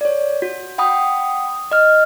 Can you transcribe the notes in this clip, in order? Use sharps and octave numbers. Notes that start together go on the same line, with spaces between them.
C#5 D5
F#4
F#5 G5 B5 D#6
D#5 F6